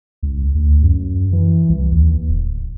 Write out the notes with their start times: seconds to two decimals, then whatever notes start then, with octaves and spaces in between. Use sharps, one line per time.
0.23 C#2
0.55 D2
0.82 F#2
1.33 E3
1.69 C2
1.92 D#2
2.29 D1